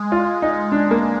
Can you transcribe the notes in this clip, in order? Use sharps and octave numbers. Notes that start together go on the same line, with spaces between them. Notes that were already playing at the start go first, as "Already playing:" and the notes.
Already playing: G#3
F4
D#4
D4
A#3